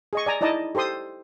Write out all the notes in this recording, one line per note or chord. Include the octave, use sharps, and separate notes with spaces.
G#4 D#5 C#6
D5 G#5 A#5
D#4 E4 D5 D#5 A5
G4 A4 C5 C6 D#6